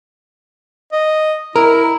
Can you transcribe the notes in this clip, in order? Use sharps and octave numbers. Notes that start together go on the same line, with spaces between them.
D#5
E4 A#4